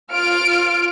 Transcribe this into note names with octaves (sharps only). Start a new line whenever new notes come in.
F4 F6 D7